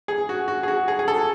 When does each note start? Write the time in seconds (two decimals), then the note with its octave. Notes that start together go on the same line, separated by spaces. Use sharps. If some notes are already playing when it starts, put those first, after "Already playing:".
0.08 G#4
0.29 F#4
0.48 F#4
0.63 G#4
0.68 F#4
0.88 G#4
0.99 G#4
1.08 A4